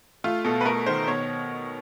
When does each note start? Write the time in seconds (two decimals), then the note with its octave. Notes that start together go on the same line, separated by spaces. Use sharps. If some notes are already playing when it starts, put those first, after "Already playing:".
0.24 A3 F4
0.45 B2 A4
0.61 B4
0.65 A3 A#4
0.87 D#3 C5
1.08 B2 C#5